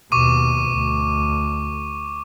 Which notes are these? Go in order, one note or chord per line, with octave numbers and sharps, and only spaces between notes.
D#2 B2 C#6 D6 D#7
D2